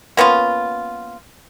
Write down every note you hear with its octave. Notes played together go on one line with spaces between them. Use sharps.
A#3 B3 C#4 F4